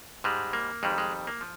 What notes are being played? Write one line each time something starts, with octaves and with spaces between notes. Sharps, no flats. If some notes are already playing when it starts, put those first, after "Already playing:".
G#2 G3 G#3
A#3
F2 D#3 G3 G#3
G#3
A#3
F3